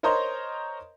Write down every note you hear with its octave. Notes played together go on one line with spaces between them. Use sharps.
A#4 C5 C#5 D#5 A#5 C6